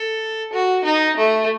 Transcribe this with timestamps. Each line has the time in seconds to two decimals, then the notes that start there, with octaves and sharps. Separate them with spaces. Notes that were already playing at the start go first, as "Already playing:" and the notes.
Already playing: A4
0.53 F#4
0.84 D#4
1.17 A3